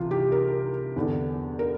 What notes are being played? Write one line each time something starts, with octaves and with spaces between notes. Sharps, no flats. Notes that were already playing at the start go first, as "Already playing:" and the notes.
Already playing: C2 C3 E3 F4
G4
A#4
E2 D3
A#4